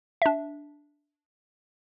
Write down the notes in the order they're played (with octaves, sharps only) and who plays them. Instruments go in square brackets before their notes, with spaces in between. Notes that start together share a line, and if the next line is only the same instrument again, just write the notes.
[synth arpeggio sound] D4 E5